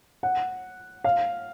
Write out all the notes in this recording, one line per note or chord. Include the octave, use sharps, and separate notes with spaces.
F#5
F5